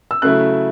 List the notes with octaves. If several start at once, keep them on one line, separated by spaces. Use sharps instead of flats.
E6
C#3 F#3 A3 E4 F#6